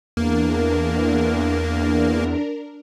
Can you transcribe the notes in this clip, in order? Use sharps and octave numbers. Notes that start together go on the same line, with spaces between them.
E2 A#3 D4 A#4